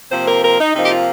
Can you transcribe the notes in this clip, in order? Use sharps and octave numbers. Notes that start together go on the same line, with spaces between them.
C3 F3 A#3 C5
A#4
A#4
D#4
C3 F3 A#3 D#4
G4
F4